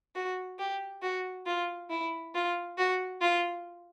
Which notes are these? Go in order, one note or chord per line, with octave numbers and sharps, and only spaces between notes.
F#4
G4
F#4
F4
E4
F4
F#4
F4